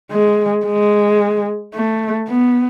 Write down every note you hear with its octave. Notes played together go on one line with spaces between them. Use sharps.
G#3
G#3
A3
B3